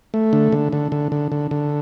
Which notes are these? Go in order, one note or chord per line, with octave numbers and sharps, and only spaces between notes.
A3
D3
D3
D3
D3
D3
D3
D3